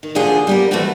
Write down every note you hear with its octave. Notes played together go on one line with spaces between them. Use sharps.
D#3
D#2 D3 F3 F4 G#4
G3 B3 A#4
E3 A3 B3 C4 F#4